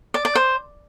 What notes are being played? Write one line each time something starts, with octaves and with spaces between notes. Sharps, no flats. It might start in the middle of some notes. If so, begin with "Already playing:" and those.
D5
D5
C5